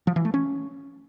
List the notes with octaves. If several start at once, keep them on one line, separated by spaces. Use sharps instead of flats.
F3
E3
A3
C#4